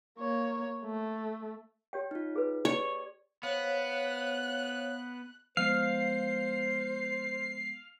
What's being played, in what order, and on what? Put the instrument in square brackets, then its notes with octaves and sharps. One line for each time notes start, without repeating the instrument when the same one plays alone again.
[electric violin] A#3 C#5
A3
[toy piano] G4 C#5 G5
[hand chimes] D#4 F4
[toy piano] G#4 B4
[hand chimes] G4 D5 [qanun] C#5
[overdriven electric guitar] B3 [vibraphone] C5 C#5 F5 [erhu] F#6
[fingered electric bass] F3 G#3 B3 [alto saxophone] C5 [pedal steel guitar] F5 [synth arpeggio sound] C7